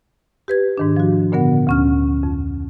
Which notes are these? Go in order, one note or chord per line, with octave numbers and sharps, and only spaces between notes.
G4 B4 G#6
G#2 D#3 D4
F3 F#4
A#2 D3 B3 A#4 F#5
D2 C#4 F6
F2